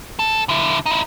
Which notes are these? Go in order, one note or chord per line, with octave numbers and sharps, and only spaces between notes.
A4
D3 E4
D#4 E4